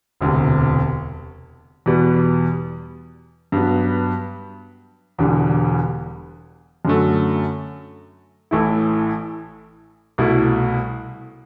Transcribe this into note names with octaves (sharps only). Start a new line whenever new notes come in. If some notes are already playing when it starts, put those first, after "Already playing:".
E1 D2 C3
E2 B2 G3 B3
G2 F#3 B3
E1 E2 D3 G3
F#2 D3 F#3 A3
A1 A2 E3 A3 E4
C2 B2 A3 E4